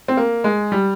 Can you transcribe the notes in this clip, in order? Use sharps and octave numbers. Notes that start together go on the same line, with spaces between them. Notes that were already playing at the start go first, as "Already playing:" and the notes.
C4
A#3
G#3
G3